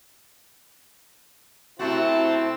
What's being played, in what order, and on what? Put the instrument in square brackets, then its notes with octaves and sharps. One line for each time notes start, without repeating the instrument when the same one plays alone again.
[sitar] C3 A3 F#4 [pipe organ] C4 A5 [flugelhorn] E4